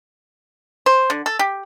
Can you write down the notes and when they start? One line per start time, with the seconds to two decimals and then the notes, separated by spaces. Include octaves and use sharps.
0.86 C5
1.10 D3
1.26 A4
1.39 G4